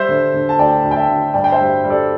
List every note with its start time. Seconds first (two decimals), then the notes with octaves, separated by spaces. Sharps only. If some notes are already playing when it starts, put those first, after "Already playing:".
Already playing: G3 C5 E5
0.09 D3
0.34 D3
0.49 A5
0.59 D2 D5 G5
0.84 D2
0.91 G5
0.96 E5 A5
1.09 D3
1.34 G2 D5 G5
1.44 G5
1.52 C5 E5
1.59 G3
1.84 G3
1.90 A4 D5